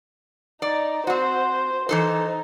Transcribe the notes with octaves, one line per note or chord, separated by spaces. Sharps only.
D#4 D5
C4 F#4 C5
E3 D#4 A4 C5